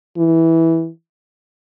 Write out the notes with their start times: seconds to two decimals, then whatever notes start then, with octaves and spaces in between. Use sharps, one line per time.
0.17 E3